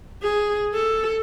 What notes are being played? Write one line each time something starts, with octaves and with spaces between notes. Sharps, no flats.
G#4
A4